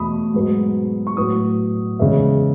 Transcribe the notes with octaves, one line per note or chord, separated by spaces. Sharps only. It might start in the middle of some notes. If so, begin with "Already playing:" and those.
Already playing: E2 B2 A3 B5 D#6
G#2 F#3 B3
C#6
A2 F#3 B3 D#6
E2 C#3 G#3 B3 E5